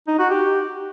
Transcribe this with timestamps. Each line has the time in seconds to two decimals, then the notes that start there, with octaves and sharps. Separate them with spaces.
0.08 D#4
0.19 F#4
0.30 G4